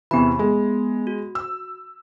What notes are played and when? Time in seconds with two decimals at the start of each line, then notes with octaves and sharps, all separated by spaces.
0.11 E2 C3 E3 B3 B5
0.39 G#3
1.07 F#4
1.35 E6